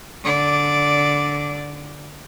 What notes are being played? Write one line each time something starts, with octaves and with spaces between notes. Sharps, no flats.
D3 D5